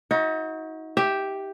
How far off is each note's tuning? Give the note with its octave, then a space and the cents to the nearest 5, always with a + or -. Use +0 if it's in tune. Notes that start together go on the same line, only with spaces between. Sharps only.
D#4 +35 F#4 -15
G4 +0 E5 +0